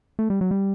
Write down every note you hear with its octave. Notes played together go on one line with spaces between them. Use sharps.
A3
G3
F#3
G3